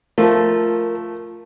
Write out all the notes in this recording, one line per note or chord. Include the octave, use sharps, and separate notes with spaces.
F3 A3 F4 A#4